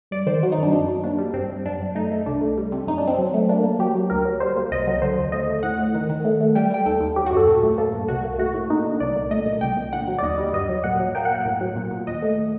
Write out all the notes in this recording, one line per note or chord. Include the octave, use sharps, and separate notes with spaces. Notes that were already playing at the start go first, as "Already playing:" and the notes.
G2 D5
D#3 C5
F#3 F#4
D#4
G2 D4
F#2 D4
F#3
A#3 D4
G3
G2 C4
G2
F#2 D4
F#2
A3 D#4
A3
C2 D4
A3
G3
C3
F#2 D#4
D4
F#2
C4
F#3
A3
A#3 D4
A#3
F#3 G4
F#3
D2 A#4
F#3
G3 C5
A#3
C2 D#5
F#3
D3 C5
D#2
A3 D#5
A3
A2 F#5
A2
D#3
D#3
A3
A3
G3 G5
G3 G5
D#2 A4
D#2
F#3 G4
F#4
F#2 A4
A#2
A3
A#3 A4
G2
C2 F#4
A#3
A3 F#4
A2
A#3 D#4
D3
C2 D5
A#2
A3 D#5
A#2
C2 G5
A#2
D3 F#5
F#3
D5
D#2 D#5
G3
G2 D#5
F#3
A#2 F#5
F#3
A#3 G5
F#5
A#3
F#5
A2
F#3
A#2
A#2
D#2 D#5
A3